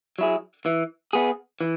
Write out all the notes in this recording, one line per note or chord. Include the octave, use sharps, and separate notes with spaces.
F#3 E4 G#4
E3
B3 G#4
E3